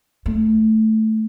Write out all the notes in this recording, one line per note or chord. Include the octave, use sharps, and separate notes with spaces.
A3